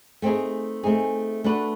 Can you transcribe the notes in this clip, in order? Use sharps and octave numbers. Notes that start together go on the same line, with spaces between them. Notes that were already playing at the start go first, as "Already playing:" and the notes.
A3 C4 D#4 G#4
A3 C4 D#4 G#4
A3 D4 F#4 B4